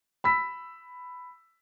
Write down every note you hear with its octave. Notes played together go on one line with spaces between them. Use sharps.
B5 E6 B6